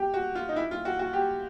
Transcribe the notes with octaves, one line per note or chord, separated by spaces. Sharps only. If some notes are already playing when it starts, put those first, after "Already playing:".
Already playing: G4
F#4
F4
D#4
E4
F4
F#4
F#4
G4